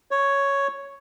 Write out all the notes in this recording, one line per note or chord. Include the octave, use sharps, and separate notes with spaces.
C#5